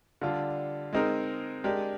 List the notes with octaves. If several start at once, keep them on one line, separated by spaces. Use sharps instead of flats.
D3 G3 D4 F4
G#3 C4 D#4 A#4
G#3 D4 G4 A#4